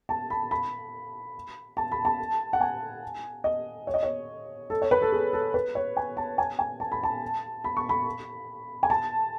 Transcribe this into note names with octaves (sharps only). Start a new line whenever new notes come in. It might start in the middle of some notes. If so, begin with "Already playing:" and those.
A5
B5
B5
A5
B5
A5
F#5
G#5
D#5
C#5
D#5
C#5
A4
C#5
B4
A4
G#4
A4
B4
C#5
G#5
A5
G#5
G#5
A5
B5
A5
B5
C#6
B5
G#5
A5